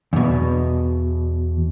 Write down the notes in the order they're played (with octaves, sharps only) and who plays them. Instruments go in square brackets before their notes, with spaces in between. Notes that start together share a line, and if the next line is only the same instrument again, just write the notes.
[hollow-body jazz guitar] E2 B2